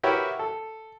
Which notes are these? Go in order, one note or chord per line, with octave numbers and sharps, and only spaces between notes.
E4 F#4 G4 A#4 B4 C#5
A4